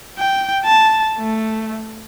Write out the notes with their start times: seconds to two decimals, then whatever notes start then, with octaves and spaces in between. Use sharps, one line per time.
0.18 G5
0.65 A5
1.18 A3